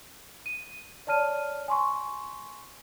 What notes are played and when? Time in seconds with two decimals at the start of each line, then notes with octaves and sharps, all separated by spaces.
0.46 D#7
1.07 C#5 D5 A5 F6 D#7
1.68 G#5 C6 C#6